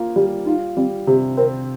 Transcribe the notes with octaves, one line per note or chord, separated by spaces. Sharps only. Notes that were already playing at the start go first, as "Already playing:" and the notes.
Already playing: A#3 F4
G3 G4
D#4 F4
G3 C4
C3 G4
C4 A#4